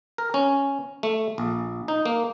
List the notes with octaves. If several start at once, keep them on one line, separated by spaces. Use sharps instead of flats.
A#4
C#4
A3
A#1
D#4
A#3